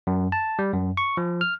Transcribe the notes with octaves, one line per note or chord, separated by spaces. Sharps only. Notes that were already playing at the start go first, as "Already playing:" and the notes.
F#2
A5
G3
F#2
C#6
F3
F6